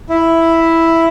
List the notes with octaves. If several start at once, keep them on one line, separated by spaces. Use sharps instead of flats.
E4